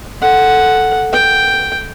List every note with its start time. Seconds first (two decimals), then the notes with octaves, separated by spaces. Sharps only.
0.21 A4 F#5
1.13 G5